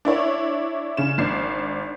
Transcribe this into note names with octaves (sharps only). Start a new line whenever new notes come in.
D4 E4 C#5
C#3 E7
G#1 D4 C7